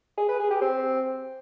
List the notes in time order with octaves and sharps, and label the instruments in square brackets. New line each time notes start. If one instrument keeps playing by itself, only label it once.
[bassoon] G#4
B4
G#4
G4
C4